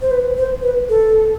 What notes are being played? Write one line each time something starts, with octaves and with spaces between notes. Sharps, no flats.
C5
B4
C5
B4
A4